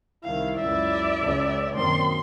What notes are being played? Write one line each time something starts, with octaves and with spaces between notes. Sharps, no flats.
C2 D#3 E4 F5
C#2 F#2 D5 E5
C#2
F#2 A#2 D#3 C4 C6